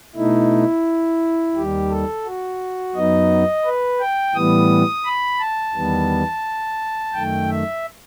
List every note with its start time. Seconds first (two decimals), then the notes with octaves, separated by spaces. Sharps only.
0.15 B2 A3 D#4 E4
1.55 D#2 D#3 G3 G4
1.90 A4
2.25 F#4
2.95 F#2 F#3 B3 D#4 D#5
3.65 B4
4.00 G5
4.35 A2 E3 G3 B3 D#6
5.05 B5
5.39 A5
5.74 E2 D#3 G3 B3
7.13 F#2 D#3 A3 G5
7.49 E5